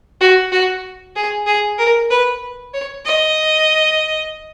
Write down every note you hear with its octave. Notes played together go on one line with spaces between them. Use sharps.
F#4
F#4
G#4
G#4
A#4
B4
C#5
D#5